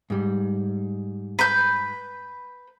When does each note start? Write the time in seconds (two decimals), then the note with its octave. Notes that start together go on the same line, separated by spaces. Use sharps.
0.10 G#2 G3
1.39 B4 G6